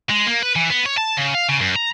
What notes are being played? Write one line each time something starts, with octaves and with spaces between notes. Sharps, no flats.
G#3
A#3
B4
E3
B3
C#5
A5
C#3
F5
C#3
F#2
A#5